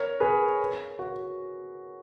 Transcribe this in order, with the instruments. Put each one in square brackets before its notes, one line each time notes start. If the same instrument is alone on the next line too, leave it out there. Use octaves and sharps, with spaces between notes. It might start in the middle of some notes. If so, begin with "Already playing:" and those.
Already playing: [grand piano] A#4 C#5
G#4 B4
F#4